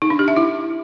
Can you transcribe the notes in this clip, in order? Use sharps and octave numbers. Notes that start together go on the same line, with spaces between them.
D#4
D4
G4
E5
E4